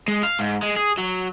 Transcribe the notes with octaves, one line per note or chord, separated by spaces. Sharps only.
G#3
F5
G#2
G#3
G#4
F#3